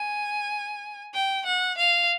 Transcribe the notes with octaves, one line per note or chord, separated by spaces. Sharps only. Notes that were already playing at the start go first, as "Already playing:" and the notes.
Already playing: G#5
G5
F#5
F5